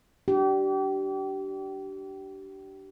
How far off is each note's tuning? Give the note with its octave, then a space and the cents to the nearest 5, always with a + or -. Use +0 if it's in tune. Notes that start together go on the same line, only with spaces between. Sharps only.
D4 +0 G4 -30